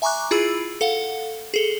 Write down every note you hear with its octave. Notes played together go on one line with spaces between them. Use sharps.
E5 G#5 A#5 C#6 D6 F#6
E4 F4 G#4 B5 E6
A4 F5 F#5
G#4 A4